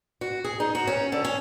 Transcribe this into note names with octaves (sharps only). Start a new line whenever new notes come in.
F#4
G#4
D#4
F#4
C#4
D3
C#4